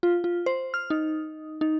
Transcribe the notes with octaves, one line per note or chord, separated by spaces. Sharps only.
F4
F4
C5
F6
D#4
D#4